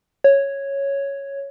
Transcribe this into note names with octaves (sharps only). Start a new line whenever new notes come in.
C#5